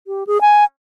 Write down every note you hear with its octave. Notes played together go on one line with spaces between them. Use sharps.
G4
G#4
G#5